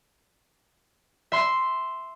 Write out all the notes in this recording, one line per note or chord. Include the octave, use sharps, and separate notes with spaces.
E5 C6